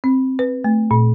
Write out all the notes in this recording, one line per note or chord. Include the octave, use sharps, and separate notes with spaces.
C4
B4
A3
A#2